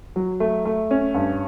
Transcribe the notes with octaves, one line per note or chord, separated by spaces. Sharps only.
F#3
A3
A3
C#4
G2